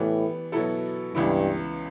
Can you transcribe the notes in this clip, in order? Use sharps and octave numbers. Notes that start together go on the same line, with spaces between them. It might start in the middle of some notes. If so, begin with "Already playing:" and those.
Already playing: A2 E3 G3 B3
B2 F#3 B3 E4 A4
C#2 G2 C#3 E3 B3 E4